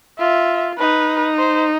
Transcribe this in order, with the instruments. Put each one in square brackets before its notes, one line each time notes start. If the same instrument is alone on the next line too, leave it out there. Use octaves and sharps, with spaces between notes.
[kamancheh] F4 [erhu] E5
[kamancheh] D#4 [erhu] B4
[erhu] C5